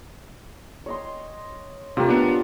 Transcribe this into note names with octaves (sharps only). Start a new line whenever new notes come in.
C#5 D#5 C6
C3 A3 F4 G4 A#4
B3 D4